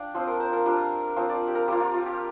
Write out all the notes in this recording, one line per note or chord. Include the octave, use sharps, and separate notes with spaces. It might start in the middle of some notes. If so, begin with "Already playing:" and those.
Already playing: D4 D5 F5 G5
F3 C4 F4 C5
A#4
C5
A#4
G3 D4 F4
F3 C4 F4
D5
G4
A#4
G3 A#3 F4 G4
F4
F4
G4